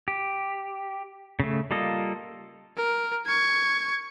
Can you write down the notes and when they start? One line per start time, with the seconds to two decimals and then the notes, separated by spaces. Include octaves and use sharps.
0.08 G4
1.40 C#3 A3
1.71 G3 A#3 F4 A4 D#5
2.77 A#4
3.26 C#6 G#6